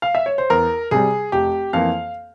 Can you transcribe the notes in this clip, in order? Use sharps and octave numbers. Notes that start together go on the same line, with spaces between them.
F5
E5
C#5
C5
E2 A#4
C3 G3 G#4
F1 G4
F2 E3 A#3 F5